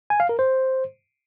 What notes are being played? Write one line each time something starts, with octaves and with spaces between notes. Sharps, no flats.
G#5
F5
A#4
C5